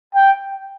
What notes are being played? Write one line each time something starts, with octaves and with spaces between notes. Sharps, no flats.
G5